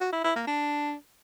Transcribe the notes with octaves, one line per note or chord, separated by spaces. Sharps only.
F#4
E4
E4
A#3
D4